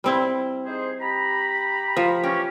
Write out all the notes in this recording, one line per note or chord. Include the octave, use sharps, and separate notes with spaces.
G3 C4 E4
D#4 G#4 C5
G4 A#5 B5
F3
E3 A#3 C#4 G4